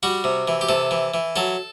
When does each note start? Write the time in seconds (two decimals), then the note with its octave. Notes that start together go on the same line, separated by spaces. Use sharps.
0.03 G3 F#4
0.24 C3
0.48 E3
0.61 G4
0.69 C3 A4
0.91 E3
1.14 E3
1.36 F#3 A4